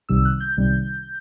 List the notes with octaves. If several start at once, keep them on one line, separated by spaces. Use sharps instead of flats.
C2 C3 D#3 G3 E6
F#6
G6
C2 C3 D#3 G3